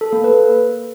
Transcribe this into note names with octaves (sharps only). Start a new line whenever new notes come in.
A4
A#3
B4